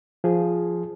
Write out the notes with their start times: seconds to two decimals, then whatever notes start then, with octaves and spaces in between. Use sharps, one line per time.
0.24 F3 G#4